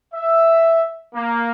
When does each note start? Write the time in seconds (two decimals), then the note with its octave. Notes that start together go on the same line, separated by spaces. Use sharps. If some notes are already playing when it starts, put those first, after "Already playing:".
0.14 E5
1.15 A#3